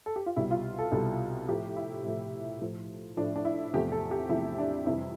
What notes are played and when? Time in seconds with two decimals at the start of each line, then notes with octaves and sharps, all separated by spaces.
0.06 A4
0.16 G4
0.26 F4
0.36 C2 B2 G3 E4
0.51 F4
0.79 A4
0.92 C2 B2 G3 A4
1.48 A2 F3 A3 G4
1.76 E4
2.04 A2 F3 A3
2.61 A2 F3 A3
3.17 A2 F3 A3 D4
3.36 D4
3.45 E4
3.73 E2 C3 F3 A3 G4
3.92 A4
4.11 G4
4.29 E2 C3 F3 A3 E4
4.58 D4
4.86 F2 C3 E3 G3 E4